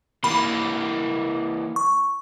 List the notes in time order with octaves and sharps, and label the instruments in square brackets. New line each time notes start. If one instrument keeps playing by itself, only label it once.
[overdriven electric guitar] E3 A#3 [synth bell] B5
[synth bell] C#6